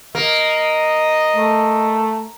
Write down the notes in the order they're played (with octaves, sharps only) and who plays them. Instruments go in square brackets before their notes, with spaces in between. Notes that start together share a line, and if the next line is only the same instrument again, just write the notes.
[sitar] A#3 [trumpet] D#5
[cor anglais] A3